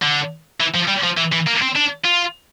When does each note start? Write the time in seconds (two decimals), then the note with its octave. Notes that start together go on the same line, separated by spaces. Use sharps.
0.02 D3
0.60 E3
0.75 F3
0.88 G3
1.04 F3
1.18 E3
1.32 E3
1.47 A#3
1.61 C4
1.75 D4
2.04 F4